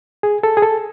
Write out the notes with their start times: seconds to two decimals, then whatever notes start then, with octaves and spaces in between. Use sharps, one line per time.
0.23 G#4
0.43 A4
0.57 G#4
0.62 A4